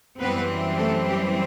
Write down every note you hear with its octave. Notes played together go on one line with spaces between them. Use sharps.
F#2 E3 G3 B3 C4 B4
A3 A4
G4